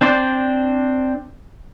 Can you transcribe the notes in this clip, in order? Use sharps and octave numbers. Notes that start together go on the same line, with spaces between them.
C4 D4 C5 D5